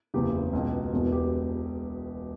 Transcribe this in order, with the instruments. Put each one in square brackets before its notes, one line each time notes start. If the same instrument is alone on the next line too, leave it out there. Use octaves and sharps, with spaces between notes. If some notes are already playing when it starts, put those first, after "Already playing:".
[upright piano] F#1 E2 C#3 G4
C#2 B2
E1 E2 B2
G4